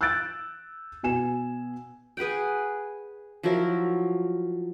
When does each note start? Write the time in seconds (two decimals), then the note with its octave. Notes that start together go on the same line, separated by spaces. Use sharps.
0.01 E6 F#6 G6 A6 D7
1.03 B2 G#5 E7
2.17 G#4 B4 F#5 G5
3.43 F3 F#3 E4 A#4